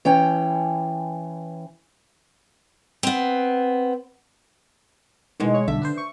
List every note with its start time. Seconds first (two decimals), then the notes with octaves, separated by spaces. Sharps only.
0.05 E3 C#4 G5
3.03 B3 C4
5.40 B2 D#3 E3 G#3
5.54 C#5
5.68 B1 G2 D3 E5 B6
5.82 D4 B4 C5
5.98 C#6